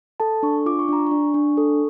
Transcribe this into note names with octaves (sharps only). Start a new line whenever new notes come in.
A4 A5
D4 C#6
F4 D6
C#6
D4 A#5
D4 C#6
D4
A4